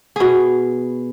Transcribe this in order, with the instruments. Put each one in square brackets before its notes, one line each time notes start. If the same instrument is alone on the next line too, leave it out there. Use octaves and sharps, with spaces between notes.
[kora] B2 G#4